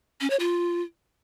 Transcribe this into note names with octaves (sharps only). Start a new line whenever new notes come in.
C#4
C#5
F4